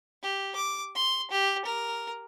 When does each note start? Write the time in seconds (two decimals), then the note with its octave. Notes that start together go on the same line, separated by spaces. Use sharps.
0.23 G4
0.55 D6
0.95 C6
1.31 G4
1.65 A#4